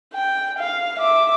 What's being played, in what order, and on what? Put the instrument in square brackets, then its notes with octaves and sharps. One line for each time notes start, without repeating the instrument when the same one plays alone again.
[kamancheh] G5
F5
E5 D6